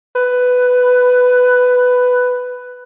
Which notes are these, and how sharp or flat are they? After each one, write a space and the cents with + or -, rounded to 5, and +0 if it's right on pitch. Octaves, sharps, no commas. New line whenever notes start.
B4 +10